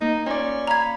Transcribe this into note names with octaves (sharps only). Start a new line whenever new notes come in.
A#3 D#4
C#4 F4 D5
F5 A#5 B5 G#6